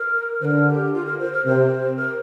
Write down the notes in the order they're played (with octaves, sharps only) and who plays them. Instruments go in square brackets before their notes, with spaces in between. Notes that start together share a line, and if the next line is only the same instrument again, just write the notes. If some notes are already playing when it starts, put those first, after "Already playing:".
Already playing: [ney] A#4
[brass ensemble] D3 [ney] A#4 C5
[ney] G4
F4
A#4
C5
A#4
[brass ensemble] C3 [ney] C5
[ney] A#4